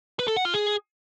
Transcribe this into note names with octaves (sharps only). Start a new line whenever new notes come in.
B4
A4
F#5
F4
G#4